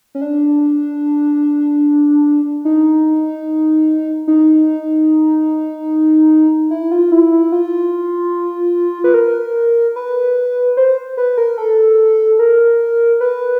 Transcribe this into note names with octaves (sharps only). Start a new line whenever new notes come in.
C#4
D4
D#4
D#4
E4
F4
E4
E4
F4
B4
A#4
B4
C5
B4
A#4
A4
A#4
B4